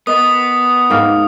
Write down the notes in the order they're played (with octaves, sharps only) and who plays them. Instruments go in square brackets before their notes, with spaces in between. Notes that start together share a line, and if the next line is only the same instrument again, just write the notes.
[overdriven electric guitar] B3 [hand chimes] A#4 D#5 [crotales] D#6
[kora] G#2 A#3 G5 [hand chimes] D#4 A#4 F6